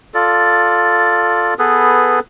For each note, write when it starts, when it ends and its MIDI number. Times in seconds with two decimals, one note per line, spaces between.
0.14 1.54 65
0.14 1.54 69
0.14 1.54 74
1.59 2.20 59
1.59 2.20 68
1.59 2.20 69
1.59 2.20 71